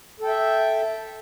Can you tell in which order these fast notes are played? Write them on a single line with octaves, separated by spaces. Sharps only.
A4 G5 E5